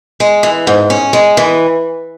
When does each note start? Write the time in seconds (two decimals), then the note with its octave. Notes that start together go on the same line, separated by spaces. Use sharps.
0.20 G#3
0.43 E3
0.67 G#2
0.90 C#4
1.13 G#3
1.37 E3